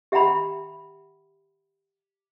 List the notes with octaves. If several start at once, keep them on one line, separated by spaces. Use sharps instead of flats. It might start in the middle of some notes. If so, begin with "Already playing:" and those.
G4 E5 F#5 G5 A#5 B5